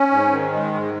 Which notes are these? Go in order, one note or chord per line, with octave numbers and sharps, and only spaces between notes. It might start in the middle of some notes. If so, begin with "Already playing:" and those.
Already playing: C#4
G#2
D#3
G#3
G#2